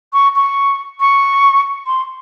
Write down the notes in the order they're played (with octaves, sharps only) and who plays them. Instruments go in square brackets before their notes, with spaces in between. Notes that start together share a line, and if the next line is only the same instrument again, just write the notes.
[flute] C#6
C#6
C#6
C6